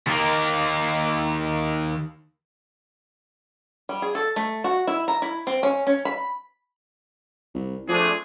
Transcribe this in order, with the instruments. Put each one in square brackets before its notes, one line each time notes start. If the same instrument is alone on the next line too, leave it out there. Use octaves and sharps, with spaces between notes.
[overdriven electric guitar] D#2 A#3
[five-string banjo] G3
G#4
A4
A3
F#4
E4
A#5
E4
C4
C#4
C#4
B5
[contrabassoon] C2
[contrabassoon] F3 [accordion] A3 C4 D4 [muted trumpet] G#4